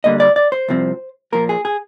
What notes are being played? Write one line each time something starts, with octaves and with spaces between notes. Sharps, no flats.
D2 D3 G3 A#3 D#5
D5
D5
C5
C2 C3 F3 C4
A#2 F3 A#3 A#4
G#4
G#4